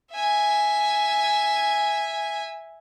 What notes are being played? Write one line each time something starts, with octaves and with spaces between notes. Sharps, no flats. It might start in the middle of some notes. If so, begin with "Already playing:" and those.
E5 G#5